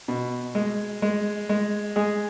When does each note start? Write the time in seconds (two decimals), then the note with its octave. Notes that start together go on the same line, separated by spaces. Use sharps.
0.08 B2
0.55 G#3
1.02 G#3
1.49 G#3
1.96 G#3 G#4